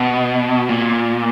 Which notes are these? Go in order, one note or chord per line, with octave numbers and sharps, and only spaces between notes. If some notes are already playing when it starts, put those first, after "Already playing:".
Already playing: B2
A#2